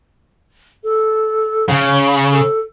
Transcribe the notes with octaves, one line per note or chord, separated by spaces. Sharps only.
A4
C#3 C#5
A4